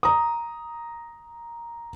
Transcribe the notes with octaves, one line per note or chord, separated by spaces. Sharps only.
A#5 D#6